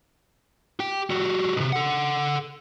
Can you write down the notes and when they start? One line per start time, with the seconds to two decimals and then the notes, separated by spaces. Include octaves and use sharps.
0.80 G4 G5
1.10 G3 F#4
1.56 B1 C3
1.72 A4 F#5